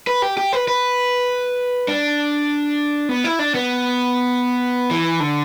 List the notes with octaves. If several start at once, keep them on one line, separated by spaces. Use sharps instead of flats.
B4
G4
G4
B4
B4
D4
B3
E4
D4
B3
E3
D3